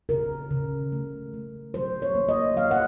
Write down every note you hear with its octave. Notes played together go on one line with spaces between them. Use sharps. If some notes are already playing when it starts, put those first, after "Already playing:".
C#3 A#4
C#3
A3
A3
F#3 C5
C#5
A#3
D#5
F#3 F5
F#5